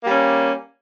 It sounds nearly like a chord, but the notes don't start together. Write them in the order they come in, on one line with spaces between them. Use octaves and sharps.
A#3 G3 C#4